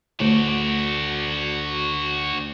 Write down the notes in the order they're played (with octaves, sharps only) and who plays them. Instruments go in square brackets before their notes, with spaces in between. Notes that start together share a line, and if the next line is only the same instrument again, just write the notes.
[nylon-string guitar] D2 [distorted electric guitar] F#4 D5